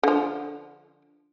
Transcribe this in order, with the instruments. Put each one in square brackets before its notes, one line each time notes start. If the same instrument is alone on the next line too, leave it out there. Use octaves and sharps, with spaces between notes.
[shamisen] D3 F3